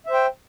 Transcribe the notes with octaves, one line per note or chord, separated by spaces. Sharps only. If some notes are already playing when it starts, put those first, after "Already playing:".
C5 E5 G5